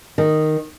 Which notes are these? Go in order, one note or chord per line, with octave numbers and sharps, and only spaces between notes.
D#3